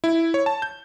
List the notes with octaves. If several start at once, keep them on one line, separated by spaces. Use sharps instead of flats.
E4
C#5
A5
G6